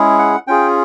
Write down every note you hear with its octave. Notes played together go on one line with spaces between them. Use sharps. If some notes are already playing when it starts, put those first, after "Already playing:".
Already playing: G#3 C#4 E4 G#4
F#5
C#4 F4 G#4 G5